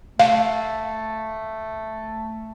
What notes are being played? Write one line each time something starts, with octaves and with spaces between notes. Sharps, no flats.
A3 F5